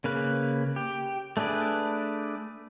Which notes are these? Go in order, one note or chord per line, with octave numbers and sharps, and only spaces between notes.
C#3 A#3 B4
G4
A3 D4 G#4 B4 D5